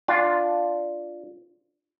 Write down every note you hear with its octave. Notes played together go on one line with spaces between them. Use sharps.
D4 F4